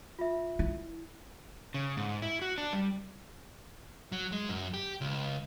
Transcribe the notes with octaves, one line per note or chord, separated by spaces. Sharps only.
F4 E5
E4
C#3
G#2
E4
F#4
D4
G3
F#3
G#3
F#2
G4
C#2